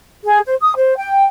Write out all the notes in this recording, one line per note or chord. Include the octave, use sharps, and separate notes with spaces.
G#4
C5
D#6
C5
G5